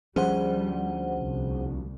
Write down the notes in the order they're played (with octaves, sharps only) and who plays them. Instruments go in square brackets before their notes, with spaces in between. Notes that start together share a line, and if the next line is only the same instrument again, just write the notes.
[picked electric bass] D2 F3 C#4 [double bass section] G3 [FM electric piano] G#4 C5 F#5
[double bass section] C2